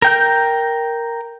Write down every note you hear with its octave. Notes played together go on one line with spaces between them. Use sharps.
A#4 G5 G6